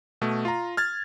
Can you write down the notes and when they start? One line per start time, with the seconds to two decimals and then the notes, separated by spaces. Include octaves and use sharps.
0.21 B2 A3
0.45 F4 A#5
0.77 F6 G#6 A6